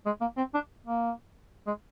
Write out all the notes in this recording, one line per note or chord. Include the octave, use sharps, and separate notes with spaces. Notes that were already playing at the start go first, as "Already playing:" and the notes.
G#3
A#3
C4
D4
A#3
G#3